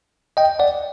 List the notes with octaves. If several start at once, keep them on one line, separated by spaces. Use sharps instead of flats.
D#5 G5
D5 F#5